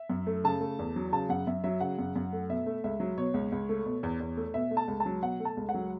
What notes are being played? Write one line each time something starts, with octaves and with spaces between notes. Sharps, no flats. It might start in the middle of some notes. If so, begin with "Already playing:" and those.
Already playing: E5
F#2
A3
C#3 A5
A3
E2
F#3
C#3 A5
F#2 F#5
F#2 E5
F#3 E5
C#3 F#5
F#2
F#2
A3
B2 E5
A3
C#2 E5
F#3
B2 C#5
C#2
C#2
A3
B2
E2
E2
A3
B2 E5
A3
A5
C#2
A5
F#3
B2 F#5
A3
A5
C#2
F#5
F#3